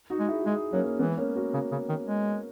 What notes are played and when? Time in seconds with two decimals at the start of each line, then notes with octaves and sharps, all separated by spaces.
0.10 D#4 F#4
0.19 G#3
0.28 E4 G#4
0.39 F#4
0.46 G#3 E4 G#4
0.73 F#3 A#3 C#4
0.86 A#3
0.99 E3 G#3 B3
1.17 A#3 C#4
1.36 F#4 A#4
1.54 C#3
1.72 C#3
1.89 D#3
2.06 G#3